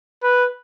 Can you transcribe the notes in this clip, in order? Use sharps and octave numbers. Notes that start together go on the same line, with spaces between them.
B4